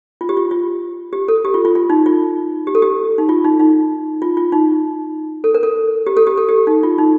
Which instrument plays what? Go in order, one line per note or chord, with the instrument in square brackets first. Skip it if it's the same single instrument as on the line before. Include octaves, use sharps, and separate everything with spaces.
[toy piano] F4
G4
F4
F4
G4
A4
G4
F4
F4
F4
D#4
F4
G4
A4
G4
D#4
F4
D#4
D#4
F4
F4
D#4
A4
A#4
A4
G4
A4
G4
A4
G4
D#4
F4
D#4